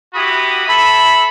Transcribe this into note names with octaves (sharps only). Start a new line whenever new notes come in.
E4 F#4 G4 B5 D#6
A4 E5 B5